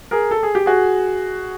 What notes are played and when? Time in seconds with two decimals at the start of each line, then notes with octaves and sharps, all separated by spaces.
0.11 G#4 A#4
0.31 A4
0.43 G#4
0.55 G4
0.66 F#4 G#4